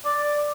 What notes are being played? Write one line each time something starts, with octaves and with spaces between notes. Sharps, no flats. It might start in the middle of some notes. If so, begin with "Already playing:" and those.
D5